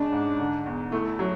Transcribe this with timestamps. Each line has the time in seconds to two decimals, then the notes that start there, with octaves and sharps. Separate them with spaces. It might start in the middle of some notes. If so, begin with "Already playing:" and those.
Already playing: C#3 G#3 D4
0.13 G#2
0.40 D3
0.66 E2
0.92 A3 E4
1.19 F#3